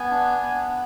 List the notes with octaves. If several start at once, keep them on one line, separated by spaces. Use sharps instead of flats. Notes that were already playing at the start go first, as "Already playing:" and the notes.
Already playing: B3 G#5
D4
B3